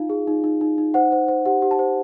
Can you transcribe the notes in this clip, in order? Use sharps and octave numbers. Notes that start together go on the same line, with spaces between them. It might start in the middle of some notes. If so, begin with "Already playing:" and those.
Already playing: D#4 F4 F5
G#4
D#4
D#4
D#4
D#4
C5 F#5
C5
C5
G4 F#5
G4
A5
C5